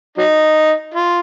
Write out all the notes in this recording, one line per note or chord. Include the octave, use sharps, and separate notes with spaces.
F#3 D#4
F4